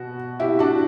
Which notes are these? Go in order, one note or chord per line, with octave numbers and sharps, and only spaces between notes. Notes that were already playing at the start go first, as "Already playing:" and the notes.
Already playing: B2 F#4
E4 G4
D4 F#4